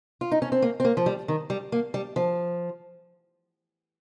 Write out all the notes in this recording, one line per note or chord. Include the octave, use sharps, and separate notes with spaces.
F4
D#4
C#4
C4
A#3
C4
A#3
F3
G3
D#3
G3
A#3
G3
F3